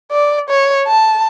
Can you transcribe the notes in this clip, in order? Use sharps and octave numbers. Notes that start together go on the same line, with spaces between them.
D5
C#5
A5